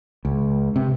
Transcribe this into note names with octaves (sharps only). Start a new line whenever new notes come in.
C#2
C3